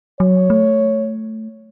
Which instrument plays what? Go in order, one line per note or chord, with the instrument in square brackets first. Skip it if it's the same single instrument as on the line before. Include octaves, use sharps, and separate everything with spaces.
[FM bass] F#3 [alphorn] C#5
[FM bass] A3